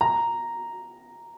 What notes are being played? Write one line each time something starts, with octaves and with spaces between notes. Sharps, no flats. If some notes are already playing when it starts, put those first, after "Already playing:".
A#5